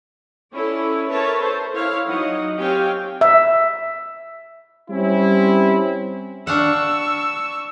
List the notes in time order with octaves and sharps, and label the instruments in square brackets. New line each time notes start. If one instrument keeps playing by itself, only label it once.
[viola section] C#4 E4 A4 D5
A#4 B4 C#5 E5 A5
A4 C5
E4 C#5 F5
F#3 D#4 D#5 F#5
C4 G4 C#5 F5 G5 G#5
[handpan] E5
[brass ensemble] G3 C4 C#4 E4
[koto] D4 F5 F#5 [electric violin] C#6 E6